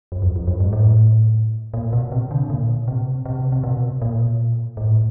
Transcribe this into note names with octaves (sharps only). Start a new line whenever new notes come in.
F#2
F2
F2
F#2
G#2
A2
A#2
B2
C3
D3
A#2
C3
C3
C3
B2
A#2
A2